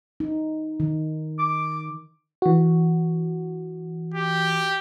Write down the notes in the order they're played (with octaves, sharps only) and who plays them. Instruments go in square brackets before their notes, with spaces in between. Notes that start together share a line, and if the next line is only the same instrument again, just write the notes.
[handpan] D#4
D#3
[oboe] D6
[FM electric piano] E3 F#4
[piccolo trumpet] G4